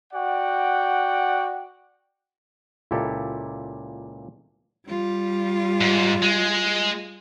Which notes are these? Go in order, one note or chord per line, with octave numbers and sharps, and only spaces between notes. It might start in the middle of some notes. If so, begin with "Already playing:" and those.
F#4 D5 F#5 G5
C#2 A#2 E4 G4 A4
G3 F4
G#2
G#3